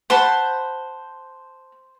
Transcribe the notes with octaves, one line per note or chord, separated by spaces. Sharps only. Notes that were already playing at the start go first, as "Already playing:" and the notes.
C5 F#5 A5 B5